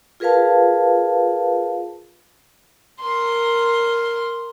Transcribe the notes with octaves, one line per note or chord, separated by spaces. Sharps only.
F4 G#4 A#4 B4 F5 A5
A#4 C6